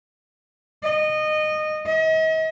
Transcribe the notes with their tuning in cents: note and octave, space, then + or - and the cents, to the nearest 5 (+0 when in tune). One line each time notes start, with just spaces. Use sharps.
D#5 -20
D#5 +40